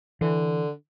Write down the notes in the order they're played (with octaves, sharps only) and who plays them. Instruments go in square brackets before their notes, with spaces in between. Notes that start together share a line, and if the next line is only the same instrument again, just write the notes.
[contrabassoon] D3 [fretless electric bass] E3